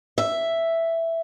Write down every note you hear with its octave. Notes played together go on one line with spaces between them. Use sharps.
E5